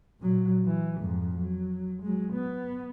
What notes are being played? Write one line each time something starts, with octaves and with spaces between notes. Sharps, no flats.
A#2 F#3
E3
F2 G#2
F#3
F#3 G#3
B3